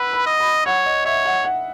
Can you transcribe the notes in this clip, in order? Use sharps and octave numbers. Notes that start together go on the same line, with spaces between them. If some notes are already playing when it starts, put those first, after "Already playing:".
Already playing: B4 F#5 B5 E6
B5
D#5
B5
C#5 F#5
D#5
C#5 E5
F#5
F#5